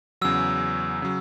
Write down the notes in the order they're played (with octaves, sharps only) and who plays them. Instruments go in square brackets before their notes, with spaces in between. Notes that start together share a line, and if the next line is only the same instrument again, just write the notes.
[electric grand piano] E2 C#3 F#3 [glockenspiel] E6
[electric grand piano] C#3 F#3